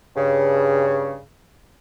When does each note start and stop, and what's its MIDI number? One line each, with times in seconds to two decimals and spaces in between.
0.16 1.18 43
0.16 1.18 49